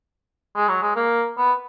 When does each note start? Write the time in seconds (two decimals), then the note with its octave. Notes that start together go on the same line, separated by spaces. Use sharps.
0.56 G#3
0.68 F#3
0.82 G#3
0.96 A#3
1.38 B3